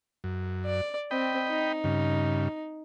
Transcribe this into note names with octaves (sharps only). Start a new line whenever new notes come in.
F#2
D5
C4 D#5 G5 B5
D#4
G2 C#3